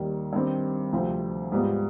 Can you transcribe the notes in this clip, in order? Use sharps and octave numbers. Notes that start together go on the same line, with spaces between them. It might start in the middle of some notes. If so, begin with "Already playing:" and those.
Already playing: D#2 D#3 G3
G2 D#3 G3 C4
D2 C3 F3 C4
G#2 G3 B3 F4